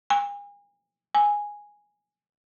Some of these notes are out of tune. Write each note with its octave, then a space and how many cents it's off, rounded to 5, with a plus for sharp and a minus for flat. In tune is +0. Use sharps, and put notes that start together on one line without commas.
G#5 -35
G#5 -5